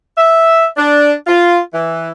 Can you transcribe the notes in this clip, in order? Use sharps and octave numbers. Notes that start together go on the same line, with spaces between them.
E5
D4
F4
E3